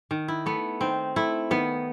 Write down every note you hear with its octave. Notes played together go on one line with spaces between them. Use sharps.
D#3
E4
A3 B3
D#3 C4
A3 E4
D#3 B3